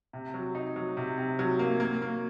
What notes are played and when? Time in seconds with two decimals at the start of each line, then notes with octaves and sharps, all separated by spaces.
0.13 C3
0.34 F#3
0.55 D#4
0.76 F#3
0.97 C3
1.18 C3
1.39 F#3
1.59 A#3
1.80 A#3
2.02 A#3